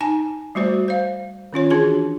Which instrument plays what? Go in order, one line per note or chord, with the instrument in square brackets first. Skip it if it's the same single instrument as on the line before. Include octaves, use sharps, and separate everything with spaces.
[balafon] D#4 G#5 A5
G3 A3 F#4 C5 D5
C5 F5
D#3 C#4 F4 C#5
E3 D4 F#4 G#4 C6